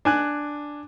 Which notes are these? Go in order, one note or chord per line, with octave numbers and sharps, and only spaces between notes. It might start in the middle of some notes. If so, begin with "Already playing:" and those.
D4 G#5 F#6